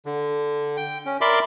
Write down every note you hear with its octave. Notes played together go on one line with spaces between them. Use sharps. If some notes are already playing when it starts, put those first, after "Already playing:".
D3
G5
C#4
A#4 D5 E5 B5 C6 D6